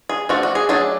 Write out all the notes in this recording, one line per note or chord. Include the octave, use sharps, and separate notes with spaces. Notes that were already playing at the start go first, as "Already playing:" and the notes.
G#4
F3 A3 D4 F#4
F#4
G#4
F#3 A3 D4 G#4